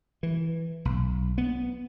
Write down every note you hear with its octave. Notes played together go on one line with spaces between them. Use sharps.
E3
B1
B3